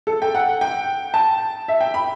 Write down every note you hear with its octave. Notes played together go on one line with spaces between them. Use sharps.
A4
G5
F#5
G5
A5
E5
G5
B5